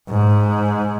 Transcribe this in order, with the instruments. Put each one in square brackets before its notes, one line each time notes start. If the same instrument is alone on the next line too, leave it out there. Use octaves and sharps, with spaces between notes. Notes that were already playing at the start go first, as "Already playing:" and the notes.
[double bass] G#2